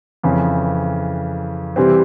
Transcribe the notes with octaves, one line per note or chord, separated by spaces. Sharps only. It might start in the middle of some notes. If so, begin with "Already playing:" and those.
F2 C#3 E3
C3 E3 G3 C4